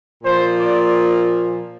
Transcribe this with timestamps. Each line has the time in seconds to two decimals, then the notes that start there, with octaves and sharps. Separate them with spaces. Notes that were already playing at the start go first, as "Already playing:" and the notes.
0.23 A#2 F3 C5
0.58 D5